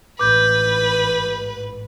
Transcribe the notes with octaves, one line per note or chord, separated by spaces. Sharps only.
A1 G#2 B4 D6 G6